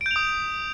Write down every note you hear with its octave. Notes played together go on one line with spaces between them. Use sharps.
D#6 G6 D7 F7